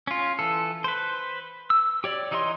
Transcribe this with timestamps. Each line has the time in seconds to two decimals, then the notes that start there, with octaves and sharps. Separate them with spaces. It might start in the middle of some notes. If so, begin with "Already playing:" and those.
0.07 C#4 F4
0.39 E3 A4
0.84 B4 C5
1.70 E6
2.04 G4 C#5 D5
2.31 E3 D#4 C#5 D#5 C6